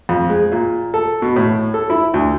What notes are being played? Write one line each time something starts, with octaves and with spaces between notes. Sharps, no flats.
F2
G#3
A#2
A4
B2
A2
A4
E4
D2